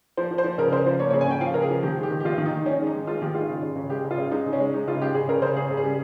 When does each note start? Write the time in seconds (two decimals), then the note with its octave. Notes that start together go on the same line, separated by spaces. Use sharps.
0.17 F3 C5
0.31 F3
0.38 C5
0.44 F3
0.58 C#3 A#4
0.72 C#3 C5
0.86 F3 C5
1.00 A#3 C#5
1.10 C#5
1.13 C#3
1.21 G#5
1.28 C#3 G5
1.41 F3 F5
1.54 C#3 A#4
1.62 G#4
1.70 F3
1.83 D#3 G4
1.97 G#3
2.03 G4
2.11 D#3
2.20 G4
2.25 D#3 F4
2.38 D#3
2.45 D#4
2.52 D#3
2.65 D#3 C#4
2.80 G#3
2.87 D#4
2.93 G#3
3.07 G#3 F4
3.22 D#3 G4
3.35 G#3 F4
3.49 C#3
3.63 C#3
3.76 C#3
3.90 G#3 G4
4.05 C#3
4.11 F4
4.19 C#3
4.31 G#3 D#4
4.46 C#3
4.53 C#4
4.60 G#3
4.74 G#3 D#4
4.87 C#3 F4
5.01 G#3 G4
5.14 C#3 G#4
5.29 C#3 A#4
5.42 C#3 C5
5.56 C#3 G#4
5.70 C#3
5.77 G#4
5.84 G3